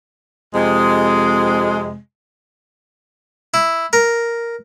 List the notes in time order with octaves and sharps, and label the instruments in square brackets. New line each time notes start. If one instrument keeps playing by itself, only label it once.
[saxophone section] F2 C3 G#3
[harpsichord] E4
A#4